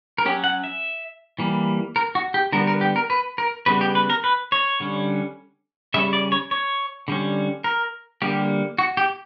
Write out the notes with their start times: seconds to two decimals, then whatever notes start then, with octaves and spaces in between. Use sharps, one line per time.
0.18 A#4
0.26 F#3 C#4 G4
0.44 F#5
0.64 E5
1.39 E3 G3 A#3
1.96 A#4
2.15 F#4
2.34 G4
2.52 D3 G3 B3 A#4
2.67 A#4
2.81 G4
2.96 A#4
3.10 B4
3.38 A#4
3.66 C#3 G3 B3 B4
3.81 G4
3.95 B4
4.10 A#4
4.24 B4
4.52 C#5
4.80 D3 G3 C#4
5.94 C#3 G3 C#4 E5
6.13 D5
6.32 C#5
6.51 C#5
7.08 D3 G3 C#4
7.64 A#4
8.22 D3 G3 A#3 G4
8.78 F#4
8.97 G4